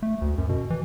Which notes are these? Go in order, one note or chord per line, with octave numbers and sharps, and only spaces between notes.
A3
D2
F#2
B2
E3